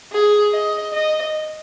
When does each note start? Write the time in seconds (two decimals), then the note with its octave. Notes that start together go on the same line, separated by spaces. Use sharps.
0.12 G#4
0.53 D#5
0.93 D#5